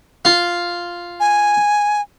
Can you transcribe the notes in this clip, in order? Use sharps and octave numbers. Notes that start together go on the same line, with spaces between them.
F4
G#5